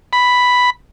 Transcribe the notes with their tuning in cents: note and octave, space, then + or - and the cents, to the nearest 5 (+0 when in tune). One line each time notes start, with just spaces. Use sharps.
B5 +0